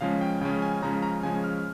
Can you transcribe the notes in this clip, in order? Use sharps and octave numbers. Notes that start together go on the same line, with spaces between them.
C#3 F3 G#3 C#4 F5
G5
C#3 F3 G#3 C#4 G5
G#5
C#3 F3 G#3 C#4 A#5
A#5
C#3 F3 G#3 C#4 G#5
F6